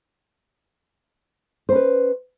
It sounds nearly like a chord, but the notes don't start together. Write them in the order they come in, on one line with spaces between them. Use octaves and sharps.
C5 C#4 B4